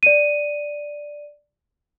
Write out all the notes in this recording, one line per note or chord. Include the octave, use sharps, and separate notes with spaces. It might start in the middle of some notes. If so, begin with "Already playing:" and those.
D5 D#7